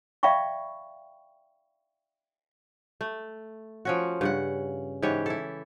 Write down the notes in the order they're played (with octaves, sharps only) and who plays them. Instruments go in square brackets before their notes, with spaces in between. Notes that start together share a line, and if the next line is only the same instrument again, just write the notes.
[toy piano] D5 E5 F5 G5 B5 C#6
[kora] A3
F3 C#4 F#4
G2 C#3 F#5
G#2 E3 G4 C#5
E4 A4